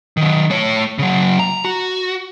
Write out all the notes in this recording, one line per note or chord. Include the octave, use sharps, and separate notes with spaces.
D#3 F#3
A3 C#5
C#3 F#3
A#5
F#4